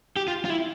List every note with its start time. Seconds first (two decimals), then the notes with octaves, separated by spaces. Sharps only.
0.16 G4
0.28 F4
0.45 F4
0.50 E4